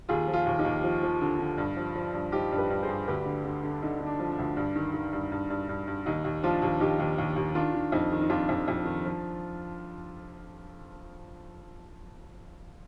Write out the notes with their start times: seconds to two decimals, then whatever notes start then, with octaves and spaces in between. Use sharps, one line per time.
0.09 D#2 F4 G#4
0.27 F3
0.33 F4 G#4
0.46 D#2
0.59 D#4 G4
0.65 D#2
0.84 F3
1.03 F3
1.21 D3
1.39 D3
1.58 G2
1.76 F3
1.95 F3
2.14 G2
2.32 F3 D#4 G4
2.52 G2
2.57 G4 B4
2.70 G2
2.83 G#4 C5
2.88 G2
3.07 D2 G4 B4
3.25 D3
3.45 D3
3.63 D3
3.71 D4
3.82 D3 D#4
4.00 D3
4.06 D4
4.19 F3
4.32 D4
4.39 D2
4.57 G2
4.75 D#3
4.94 D#3
5.13 G2
5.32 G2
5.50 G2
5.69 G2
5.87 G2
6.06 D#2 D#4
6.24 D#2
6.43 F3 D4 F4
6.62 D#2
6.80 D#2 D#4 G4
6.99 D#2
7.18 D#2
7.36 D#2
7.55 D#3 D4 F4
7.74 D#3
7.92 F2 D#4
8.12 D#3
8.21 D#4
8.30 F2 D4 F4
8.49 F2
8.68 F2
8.85 D#3
9.05 F3